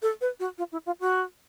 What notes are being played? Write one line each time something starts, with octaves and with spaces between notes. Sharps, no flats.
A4
B4
F#4
F4
E4
F4
F#4